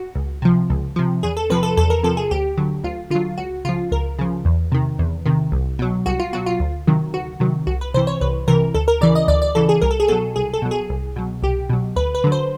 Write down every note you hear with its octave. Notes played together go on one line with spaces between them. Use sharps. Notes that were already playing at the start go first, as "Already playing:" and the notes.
Already playing: F#4
C#2
C3 F3
C#2
C3 F3
E2 G#4
A4
C3 F3 B4
A4
E2 A4
A#4
C3 F3 A4
G#4
D2 G4
D3 F#3
D2 F4
D3 F#3 F4
C#2 F#4
C#3 F3 F4
C#2 A#4
C#3 F3
E2
C3 D#3
E2
C3 D#3
C2
B2 F#3
C2 F#4
F4
B2 F#3 F#4
F4
D2
C3 D#3 F#3
D2 F#4
C3 D#3 F#3
C2 F#4
B4
C3 E3 C5
C#5
C2 B4
C3 E3 A#4
D2 A4
A#4
C#3 E3 D5
D#5
D2 D5
D5
C#3 E3 A4
G#4
C2 A#4
A4
G#4
B2 F#3 A4
C2 G#4
A4
B2 F#3
G#4
C2
B2 F#3
C2 G4
B2 F#3
D2 B4
B4
D3 F#3
C5